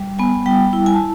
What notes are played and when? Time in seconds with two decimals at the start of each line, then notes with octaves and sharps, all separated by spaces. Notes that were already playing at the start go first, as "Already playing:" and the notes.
Already playing: G3
0.19 B3 G#5
0.46 G3 G5
0.73 E4
0.86 G#5
0.94 A5